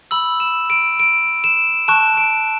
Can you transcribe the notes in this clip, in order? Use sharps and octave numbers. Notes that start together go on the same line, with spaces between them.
B5 E6 F#7
E7
D7
D7
E7
A5 C#6 F#6 E7
D7